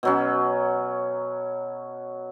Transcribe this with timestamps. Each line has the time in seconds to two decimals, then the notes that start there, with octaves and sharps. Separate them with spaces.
0.03 B2 F#3 C#4